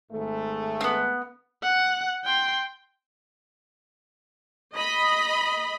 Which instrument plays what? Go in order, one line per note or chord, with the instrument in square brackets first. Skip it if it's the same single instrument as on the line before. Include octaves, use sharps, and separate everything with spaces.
[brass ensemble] G#1 G#2 A3
[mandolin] B3 C4
[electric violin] F#5
G5 C6
[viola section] D#5 B5